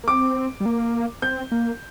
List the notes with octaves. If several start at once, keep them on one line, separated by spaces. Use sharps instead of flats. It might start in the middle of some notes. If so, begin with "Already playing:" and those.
A#3
C4 D6
G3
A#3
C4 G6
A#3